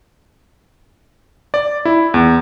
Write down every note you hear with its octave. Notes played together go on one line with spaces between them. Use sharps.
D5
E4
E2